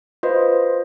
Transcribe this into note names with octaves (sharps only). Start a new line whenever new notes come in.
F4 B4 C5 D#5